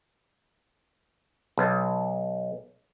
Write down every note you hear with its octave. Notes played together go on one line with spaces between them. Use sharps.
B1